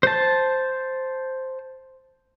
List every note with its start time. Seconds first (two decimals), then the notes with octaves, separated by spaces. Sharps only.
0.03 C5 A5